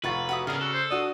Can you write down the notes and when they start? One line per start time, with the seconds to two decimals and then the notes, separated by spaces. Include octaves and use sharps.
0.04 F1 F4 B4 F#5 C#6 A6
0.29 F#4 E5 D#6
0.47 C#3 B3 G#4 A#4 D5 A#5
0.61 F#4 A4
0.74 C5
0.91 D4 F#4 D#6